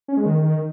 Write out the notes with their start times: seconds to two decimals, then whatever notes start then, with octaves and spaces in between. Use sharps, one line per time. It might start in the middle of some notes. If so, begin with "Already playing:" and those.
0.08 C#4
0.17 G#3
0.26 D#3